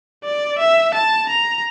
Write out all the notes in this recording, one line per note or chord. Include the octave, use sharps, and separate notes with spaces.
D5
E5
A5
A#5